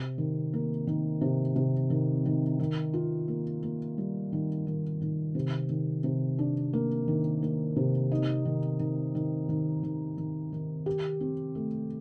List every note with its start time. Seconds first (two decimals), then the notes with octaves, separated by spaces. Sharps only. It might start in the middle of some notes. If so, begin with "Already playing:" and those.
Already playing: C3
0.18 D#3
0.53 A#3
0.87 D#3
1.21 C3
1.56 C3
1.90 D#3
2.26 D#3
2.59 D#3
2.94 F4
3.28 A#3
3.63 A#3
3.98 G3
4.32 D#3
4.67 D#3
5.01 D#3
5.35 C3
5.69 D#3
6.04 C3
6.39 D4
6.73 A#3
7.08 D#3
7.42 A#3
7.76 C3
8.12 D#4
8.45 D#3
8.80 D#3
9.15 D#3
9.49 D#3
9.83 D#3
10.18 D#3
10.53 D#3
10.86 G4
11.20 C4
11.55 A3